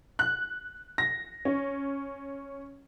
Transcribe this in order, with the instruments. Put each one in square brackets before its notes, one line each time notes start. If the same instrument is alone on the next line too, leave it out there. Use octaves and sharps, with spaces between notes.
[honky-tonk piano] F#6
A#6
C#4